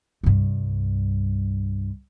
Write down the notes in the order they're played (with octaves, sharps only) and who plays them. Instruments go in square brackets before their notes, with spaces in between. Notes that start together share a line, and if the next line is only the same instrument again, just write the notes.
[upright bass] C2 G2